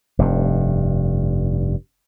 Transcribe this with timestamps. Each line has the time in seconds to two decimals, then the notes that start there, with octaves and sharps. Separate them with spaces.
0.19 F1 G2